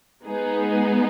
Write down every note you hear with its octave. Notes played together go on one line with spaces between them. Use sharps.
G#3 B3 D#4 G#4